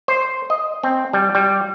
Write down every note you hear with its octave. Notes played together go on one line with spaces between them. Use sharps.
C5
D#5
C4
G3
G3